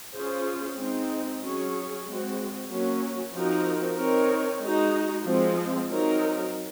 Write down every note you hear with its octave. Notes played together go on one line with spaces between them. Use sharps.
C#4 F4 G#4 C5
G#3 C4 D#4
F#3 C#4 G#4 C#5
G#3 C4 F#4
F#3 A#3 C#4
F3 C4 D#4 F#4 A#4
C4 D#4 A#4 C#5
G#3 D#4 F#4
F3 G#3 C4
F#3 C4 D#4 A#4